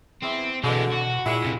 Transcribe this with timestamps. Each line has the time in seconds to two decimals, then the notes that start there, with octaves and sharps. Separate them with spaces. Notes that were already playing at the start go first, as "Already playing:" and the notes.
0.23 E2 C4 E4
0.64 B2 D3 E3 G#3
0.92 F#4
1.26 A#2 G#3 A#3 E4
1.44 F2 C3